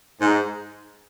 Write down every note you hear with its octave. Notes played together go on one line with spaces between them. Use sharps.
G#2